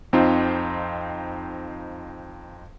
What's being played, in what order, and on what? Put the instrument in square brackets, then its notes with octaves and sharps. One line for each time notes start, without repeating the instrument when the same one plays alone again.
[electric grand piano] F2 C4 D#4 F4